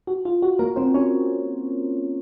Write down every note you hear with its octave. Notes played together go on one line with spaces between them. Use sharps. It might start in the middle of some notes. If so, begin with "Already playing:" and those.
F#4
F4
F#4
A#3 A#4
C4 C5
C#4 C#5